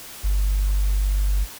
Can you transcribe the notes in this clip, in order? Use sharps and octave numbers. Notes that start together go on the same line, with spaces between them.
G1